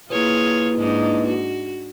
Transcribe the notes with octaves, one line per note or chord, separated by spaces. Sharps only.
A#3 E4 F4 G#4 B4 C#5
G#2 D4 D#4
F#4